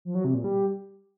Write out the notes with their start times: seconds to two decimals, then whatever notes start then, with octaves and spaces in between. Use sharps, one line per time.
0.05 F3
0.15 F#3
0.24 C3
0.34 A#2
0.44 G3